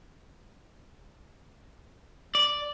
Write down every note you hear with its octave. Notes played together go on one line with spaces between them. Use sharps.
D5